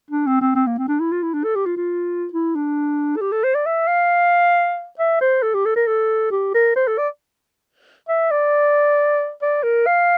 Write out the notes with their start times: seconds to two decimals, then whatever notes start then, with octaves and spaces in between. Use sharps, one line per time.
0.11 D4
0.26 C4
0.41 C4
0.55 C4
0.67 A#3
0.78 C4
0.88 D4
1.00 E4
1.12 F4
1.23 E4
1.34 D4
1.44 A4
1.55 G4
1.66 F4
1.77 F4
2.33 E4
2.55 D4
3.16 A4
3.21 G4
3.32 A4
3.44 C5
3.55 D5
3.66 E5
3.87 F5
4.99 E5
5.21 C5
5.42 A4
5.54 G4
5.65 A4
5.76 A#4
5.87 A4
6.31 G4
6.54 A#4
6.76 C5
6.87 A4
6.98 D5
8.09 E5
8.31 D5
9.42 D5
9.63 A#4
9.86 F5